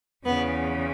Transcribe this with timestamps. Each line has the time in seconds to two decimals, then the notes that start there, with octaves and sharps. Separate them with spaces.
0.25 E2 C#3 E3 B3